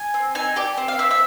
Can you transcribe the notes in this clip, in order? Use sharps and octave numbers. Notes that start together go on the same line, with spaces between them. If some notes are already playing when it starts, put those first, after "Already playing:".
Already playing: G#5
C4
D#4 G#5
G4 D5
C4
F5
C4 E5
E5